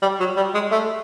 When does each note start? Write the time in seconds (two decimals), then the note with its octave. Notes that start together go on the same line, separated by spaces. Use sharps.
0.02 G3
0.20 F#3
0.37 G3
0.55 G#3
0.72 A3